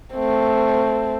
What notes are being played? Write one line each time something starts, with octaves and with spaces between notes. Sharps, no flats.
A3 C4